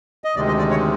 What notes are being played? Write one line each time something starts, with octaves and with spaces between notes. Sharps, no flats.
D#5
D2 C3 D#3 G#3 D5
D#5
D5
C#5